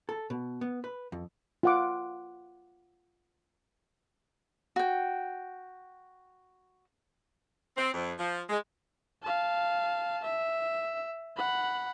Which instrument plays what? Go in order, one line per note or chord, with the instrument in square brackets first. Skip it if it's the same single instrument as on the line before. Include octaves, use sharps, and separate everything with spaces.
[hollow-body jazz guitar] A4
B2
B3
B4
F2
[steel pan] F4 F#5 D6
[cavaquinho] F#4 G5
[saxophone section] C4
F2
F3
G#3
[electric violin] F5 A5
E5
F#5 B5